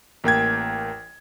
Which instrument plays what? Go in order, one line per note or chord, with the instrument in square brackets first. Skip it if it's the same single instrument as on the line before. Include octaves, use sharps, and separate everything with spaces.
[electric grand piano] A1 A#3 G5 G#6